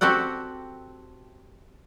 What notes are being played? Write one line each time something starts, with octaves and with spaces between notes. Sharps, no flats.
C4 F#4 G4 A4 F#5